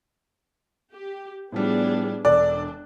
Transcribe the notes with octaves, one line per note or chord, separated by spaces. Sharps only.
G4
A2 F3 G3 B3 D4 G#4
E1 D4 A4 D5 F#6